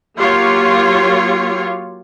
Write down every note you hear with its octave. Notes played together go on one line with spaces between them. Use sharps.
F#3 A#3 F4 G4 C#5